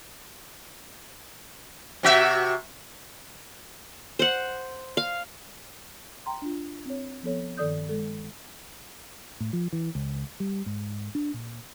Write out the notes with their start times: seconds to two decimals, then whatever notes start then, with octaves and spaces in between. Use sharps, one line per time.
2.03 C3 F#4 E5
4.19 C5 F#5
4.97 F5
6.26 G5 A#5 C6
6.42 D4 F4
6.86 C4 C#5
7.23 F3 B3 A4 C#5
7.57 G2 D#3 A4 D5 D#6 G6
7.89 G#3 A4
9.40 A2
9.53 F3
9.73 E3
9.95 C#2
10.40 G3
10.66 G#2
11.15 D4
11.34 A#2